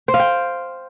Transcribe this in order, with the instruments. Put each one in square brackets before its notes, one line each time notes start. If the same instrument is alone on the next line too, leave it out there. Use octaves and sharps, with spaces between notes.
[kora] C5
F5
G5